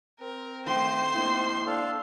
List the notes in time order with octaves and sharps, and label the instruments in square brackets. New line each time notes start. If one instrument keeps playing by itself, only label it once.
[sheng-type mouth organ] C4 [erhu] A#4
[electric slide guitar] D#3 A3 G5 [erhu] C5 [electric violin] C6 C7
[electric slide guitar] A#3 D#4 E4
[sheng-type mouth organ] D4 A4 F5